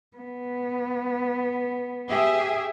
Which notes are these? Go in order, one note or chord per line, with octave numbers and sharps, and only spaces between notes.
B3
G4 G#4 E5